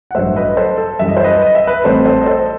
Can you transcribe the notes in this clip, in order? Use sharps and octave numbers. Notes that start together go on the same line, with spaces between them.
F#5
A1 G2 F#3 A3 C5 E5
B4 D#5
A4 C5
A4
F#2 E3 G3 E5
D#5
C5
B4 D#5
D#5
E5
B4 D#5
A1 A2 G3 C4 A4 C5
A4 C5
D#5
A4 C5